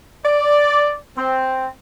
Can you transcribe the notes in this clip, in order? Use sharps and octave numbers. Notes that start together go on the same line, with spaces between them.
D5
C4